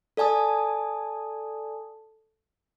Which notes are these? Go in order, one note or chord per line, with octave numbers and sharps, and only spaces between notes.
A4 D5 G#5 A5 D#6